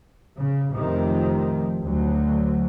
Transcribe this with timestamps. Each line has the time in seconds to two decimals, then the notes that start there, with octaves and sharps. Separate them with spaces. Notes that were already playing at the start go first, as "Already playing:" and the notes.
0.38 C#3
0.73 F1 C3 D#3 F3
1.80 D2 F#3